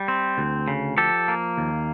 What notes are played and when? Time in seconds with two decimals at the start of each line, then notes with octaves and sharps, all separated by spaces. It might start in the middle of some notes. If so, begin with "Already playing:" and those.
Already playing: G3
0.08 C4
0.38 D2
0.68 C#3
0.97 F3 G4 A4
1.28 A#3
1.57 D#2